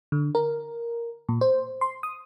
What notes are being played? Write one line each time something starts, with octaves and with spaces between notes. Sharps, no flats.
D3
A#4
A#2
C5
C6
D#6